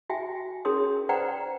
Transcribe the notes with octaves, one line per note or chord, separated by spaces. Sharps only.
F#4 E5 G5 G#5
C#4 G#4 A#4 C#5 C6 D#6
B4 C5 D5 F#5 G5 A#5